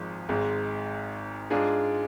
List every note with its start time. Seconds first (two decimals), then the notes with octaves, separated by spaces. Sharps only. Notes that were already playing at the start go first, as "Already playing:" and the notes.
Already playing: G#1 G#2 F3 G#3
0.29 G#1 G#2 G#3
1.50 G#2 G#3 D4 F4 G#4